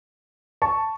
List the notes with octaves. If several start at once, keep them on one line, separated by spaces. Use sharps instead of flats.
A5 C#6